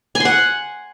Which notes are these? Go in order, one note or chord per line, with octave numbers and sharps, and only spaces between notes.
G#5
C6
F#5